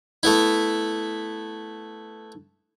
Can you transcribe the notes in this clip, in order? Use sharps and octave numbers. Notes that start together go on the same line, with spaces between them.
A3 B3 E4